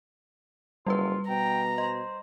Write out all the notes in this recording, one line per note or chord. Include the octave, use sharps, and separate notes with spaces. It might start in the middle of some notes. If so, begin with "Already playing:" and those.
F#1 G3 F4 B4
B2 G5 A#5
C5 D#5